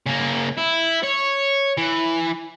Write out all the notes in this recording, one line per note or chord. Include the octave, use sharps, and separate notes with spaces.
C#3 A#3
E4
C#5
E3